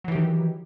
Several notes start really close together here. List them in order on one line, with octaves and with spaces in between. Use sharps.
F#3 E3 G4 D#3